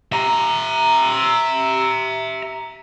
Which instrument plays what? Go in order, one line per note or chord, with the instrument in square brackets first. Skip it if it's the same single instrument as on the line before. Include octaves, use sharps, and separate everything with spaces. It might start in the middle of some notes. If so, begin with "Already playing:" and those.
[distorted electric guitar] E5 A#5